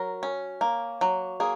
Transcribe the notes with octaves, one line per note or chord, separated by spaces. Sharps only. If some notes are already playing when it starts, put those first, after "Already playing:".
Already playing: F#3 A#4
C#4
A#3
F#3
A#3 G#4